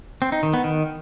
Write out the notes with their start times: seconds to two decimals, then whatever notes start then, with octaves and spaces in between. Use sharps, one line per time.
0.22 C4
0.32 D#4
0.43 D#3
0.54 B3
0.64 D#3